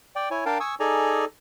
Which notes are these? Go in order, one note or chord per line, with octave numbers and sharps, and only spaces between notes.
D5 G5
E4 C#5 G#5
D4 A#4 F5 G5 A5
G#5 C#6 D#6 E6
D#4 G#4 A4 D5 G#5 A#5